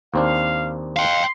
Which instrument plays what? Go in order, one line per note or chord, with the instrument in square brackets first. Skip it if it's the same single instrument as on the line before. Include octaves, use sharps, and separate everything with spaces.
[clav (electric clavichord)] D#2 C4 D4 [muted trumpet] F5
[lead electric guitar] F5 G5 [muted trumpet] C6